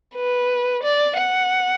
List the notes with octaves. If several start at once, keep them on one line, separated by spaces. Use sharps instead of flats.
B4
D5
F#5